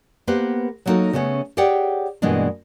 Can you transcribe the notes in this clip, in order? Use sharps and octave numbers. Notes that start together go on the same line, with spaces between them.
A#3 B3 G4 B4 C5
F#3 G3 A#3 D#4 F#4 A4
C#3 A3 B3 C#4
G4 G#4 C#5 D5 F#5 G5
G2 B2 E3 G#3 A#3 D4